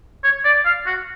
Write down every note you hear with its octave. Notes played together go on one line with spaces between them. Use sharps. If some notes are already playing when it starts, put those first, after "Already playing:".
C#5
D5
F5
F#4